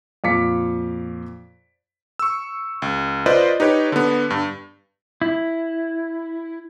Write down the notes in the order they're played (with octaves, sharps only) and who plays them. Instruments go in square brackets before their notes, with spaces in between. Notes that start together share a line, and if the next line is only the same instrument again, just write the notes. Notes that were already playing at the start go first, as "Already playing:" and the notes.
[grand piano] F2 A#2 F5 D6 B6 C#7
[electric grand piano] C#6 E6
C#2
F4 B4 C5 D5 D#5
D#4 G4 B4 C#5
D3 B3
G2
[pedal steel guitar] E4